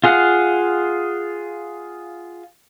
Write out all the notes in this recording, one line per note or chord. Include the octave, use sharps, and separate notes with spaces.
F4 G#4 F5 F#5